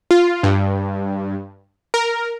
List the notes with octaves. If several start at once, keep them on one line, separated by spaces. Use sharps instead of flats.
F4
G2
A#4